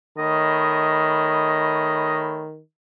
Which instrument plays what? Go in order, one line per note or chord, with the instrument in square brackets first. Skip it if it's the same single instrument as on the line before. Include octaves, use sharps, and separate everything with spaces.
[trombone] D#3 [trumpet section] A3 C#5 B5 [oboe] D#5